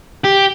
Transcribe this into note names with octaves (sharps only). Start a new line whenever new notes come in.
G4